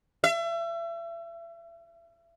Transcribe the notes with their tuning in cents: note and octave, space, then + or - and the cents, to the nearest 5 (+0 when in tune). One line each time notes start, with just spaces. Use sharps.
E5 +35